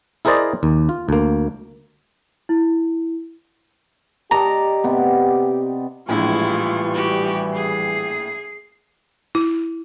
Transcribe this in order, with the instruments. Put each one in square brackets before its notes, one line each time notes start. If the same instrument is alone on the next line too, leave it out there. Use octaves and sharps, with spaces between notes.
[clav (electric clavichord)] E4 G#4 A#4 C5 D5 D#5
D#2
F4
D2 A#3
[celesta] E4
[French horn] G4 [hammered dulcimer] D5 D#5 [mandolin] A#5
[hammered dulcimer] C3 B3
[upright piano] A#1 A2 [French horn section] E3 G3 [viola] G#3 E4 [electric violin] F4 C#6
[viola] F#4 G4
[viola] G#4 [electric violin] C7
[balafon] E4